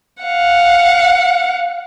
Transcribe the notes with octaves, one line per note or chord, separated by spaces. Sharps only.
F5 F#5